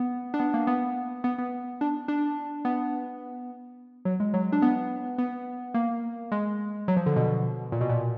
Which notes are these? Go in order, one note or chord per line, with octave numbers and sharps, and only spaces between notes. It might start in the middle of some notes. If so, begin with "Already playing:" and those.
Already playing: B3
D4
B3
A#3
B3
B3
B3
D4
D4
B3
F#3
G#3
F#3
D4
B3
B3
A#3
G#3
F#3
F3
D3
B2
A#2
B2
A#2